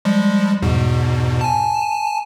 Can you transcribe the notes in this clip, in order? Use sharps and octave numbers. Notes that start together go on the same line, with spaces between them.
F3 G3 G#3
E2 G#2 B2
G#5 A5